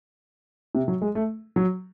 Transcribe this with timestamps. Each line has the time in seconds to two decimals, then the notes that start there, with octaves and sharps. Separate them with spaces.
0.75 C3
0.88 F#3
1.02 G#3
1.15 A3
1.56 F#3